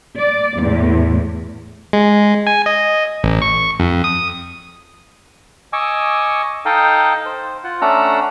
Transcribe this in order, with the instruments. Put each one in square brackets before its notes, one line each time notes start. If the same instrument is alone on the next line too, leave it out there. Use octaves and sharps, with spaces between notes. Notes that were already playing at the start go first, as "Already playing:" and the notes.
[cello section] D5
E2 A2
[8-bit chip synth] G#3
G#5
D#5
A1
C#6
F2
D#6
[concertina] D#5 G#5 C#6 D6 E6
D#4 A4 D#5 F5 G5
C5
F4 F#5
A3 C#4 D4 F#5 A#5 E6